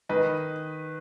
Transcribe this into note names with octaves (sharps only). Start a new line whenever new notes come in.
D#3 B4 D#5